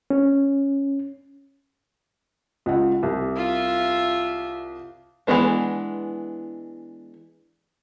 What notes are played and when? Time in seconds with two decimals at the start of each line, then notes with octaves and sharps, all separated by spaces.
0.10 C#4
2.66 C#2 F#5
3.03 C2
3.36 F4 E5
5.27 E3 F3 G#3 B3 D4